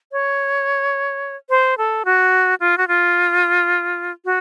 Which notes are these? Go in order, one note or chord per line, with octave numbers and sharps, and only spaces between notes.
C#5
C5
A4
F#4
F4
F#4
F4
F#4